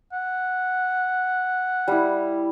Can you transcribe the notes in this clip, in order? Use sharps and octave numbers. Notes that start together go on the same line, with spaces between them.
F#5
G3 E4